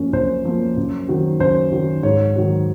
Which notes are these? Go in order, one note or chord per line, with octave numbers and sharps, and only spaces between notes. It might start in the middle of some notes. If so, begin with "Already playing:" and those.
Already playing: F#2 F3 A#3 C#4
F#2 C5
F3 A#3 C#4
F#2
D#3 F#3
F#2 C5
D#3 F#3
G#2 C#5
D#3 F#3